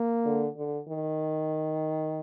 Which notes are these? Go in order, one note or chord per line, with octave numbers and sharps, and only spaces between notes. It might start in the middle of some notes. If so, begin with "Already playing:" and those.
Already playing: A#3
D3
D3
D#3